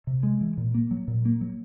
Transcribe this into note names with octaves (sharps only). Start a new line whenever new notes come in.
C3
G#3
E3
A#2
A#3
F#3
A#2
A#3
F#3